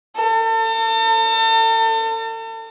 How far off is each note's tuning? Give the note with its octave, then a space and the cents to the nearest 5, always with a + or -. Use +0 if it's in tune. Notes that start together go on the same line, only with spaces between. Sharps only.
A4 +40